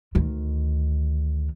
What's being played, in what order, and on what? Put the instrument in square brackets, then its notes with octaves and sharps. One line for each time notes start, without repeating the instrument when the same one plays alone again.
[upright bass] D2 D#3